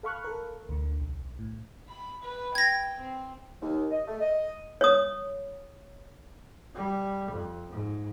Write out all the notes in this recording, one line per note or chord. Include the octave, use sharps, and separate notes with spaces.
A4 F5 B5 C#6 F6 F#6
A4 A#4
D2 D3
B1
A2
B5
B4
G5 G#6 A#6
C4
D#2
D#5
A3
D#5
C#5 D#6
G3
F2
G#2